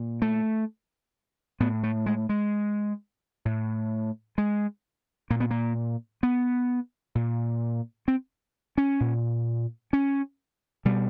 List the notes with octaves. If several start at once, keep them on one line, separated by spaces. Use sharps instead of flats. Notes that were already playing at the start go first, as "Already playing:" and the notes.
Already playing: A#2
A3
A2 B3
A3
G#3
G#3
A2
G#3
A#2 A#3
B3
A#3
B3
A#2
C4
C#4
A#2
C#4
B2 G3